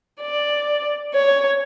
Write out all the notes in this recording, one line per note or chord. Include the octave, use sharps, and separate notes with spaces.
D5
C#5